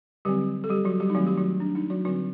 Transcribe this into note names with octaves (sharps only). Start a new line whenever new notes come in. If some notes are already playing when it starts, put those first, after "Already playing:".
D3 F#3 G3 C4 G4
A4
G3 G4
F#3 F#4
G3 G4
D#4
D#3 F#3 A3 C4 F#4
G4
F#3 F#4
D4
D#4
F#3 F#4
D3 F#3 G3 C4 F#4